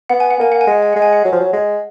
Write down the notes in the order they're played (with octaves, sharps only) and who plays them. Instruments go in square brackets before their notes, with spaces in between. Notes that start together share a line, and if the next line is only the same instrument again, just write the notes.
[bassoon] B3 [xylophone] F#5
[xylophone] G#5
F#5
[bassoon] A#3 [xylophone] G#5
[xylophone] F#5
G#5
[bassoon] G#3 [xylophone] F#5
[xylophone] G#5
[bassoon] G#3 [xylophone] F#5
[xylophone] G#5
F#5
[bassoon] F#3
F3
F#3
G#3